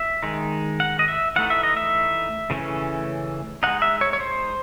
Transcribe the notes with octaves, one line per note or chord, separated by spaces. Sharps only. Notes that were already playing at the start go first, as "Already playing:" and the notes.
Already playing: E5
D#3 G#3 D#4
F#5
D#5
E5
E3 A3 D#4 F#5
E5
D#5
E5
C#3 E3 A3 C#4
G#3 D#4 F#5
E5
C#5
C#5
C5